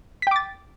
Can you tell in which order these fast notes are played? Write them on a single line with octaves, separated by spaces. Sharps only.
B6 G5 D6 A6